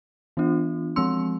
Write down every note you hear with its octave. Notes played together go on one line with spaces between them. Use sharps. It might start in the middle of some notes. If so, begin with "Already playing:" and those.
E3 B3 D4 F4
F3 G#3 C4 C6 E6